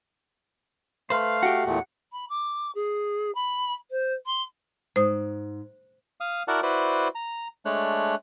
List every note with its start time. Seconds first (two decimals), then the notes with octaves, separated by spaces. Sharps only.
1.10 A3 B4 C5 F5
1.43 F#4 G4 F#5
1.66 E2 A#2 A3
2.12 B5
2.29 D6
2.75 G#4
3.35 B5
3.90 C5
4.26 C6
4.96 G#2 C5 D#6
6.20 F5 D#6
6.48 E4 F#4 A#4 D5 F#5 A5
6.63 E4 F#4 B4 C5 D5
7.15 A#5
7.65 G#3 A3 D4 C#5 F#6